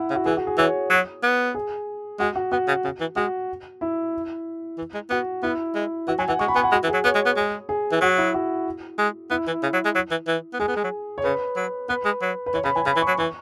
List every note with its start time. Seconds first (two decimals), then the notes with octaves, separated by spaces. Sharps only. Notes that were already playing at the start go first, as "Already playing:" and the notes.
Already playing: E4 F#5
0.10 C#3
0.15 F#4
0.26 E3 G#4
0.37 F#4
0.47 G#4
0.58 E3 C#5
0.90 F#3
1.23 B3
1.55 G#4
2.19 G#3 F#4
2.36 F#4
2.52 B3 F#4
2.68 C#3
2.85 C#3
3.00 E3
3.16 G#3 F#4
3.81 E4
4.78 E3
4.94 G#3
5.10 B3 F#4
5.43 B3 E4
5.75 G#3
6.08 E3 F#4
6.18 F#3 G#5
6.28 E3 F#5
6.39 G#3 C#6
6.48 B5
6.56 B3 G#5
6.64 F#5
6.72 G#3 F#4
6.83 E3
6.88 G#4
6.94 F#3
7.04 B3 C#5
7.15 G#3
7.26 B3
7.37 G#3
7.69 G#4
7.92 E3
8.01 F#3 F#4
8.18 E4
8.34 F#4
8.98 G#3
9.30 B3 E4
9.47 E3
9.63 C#3
9.73 F#3
9.85 G#3
9.95 F#3
10.11 E3
10.28 E3
10.53 B3
10.60 G#3 G#4
10.68 B3
10.77 G#3
10.84 F#3
11.18 C#5
11.24 C#3 B4
11.56 F#3
11.89 B3 B4
12.05 G#3
12.22 F#3
12.46 B4
12.54 E3 C#5
12.64 C#3 B5
12.76 E3 G#5
12.86 C#3 B5
12.96 E3
13.02 C#6
13.08 F#3
13.18 E3 C#6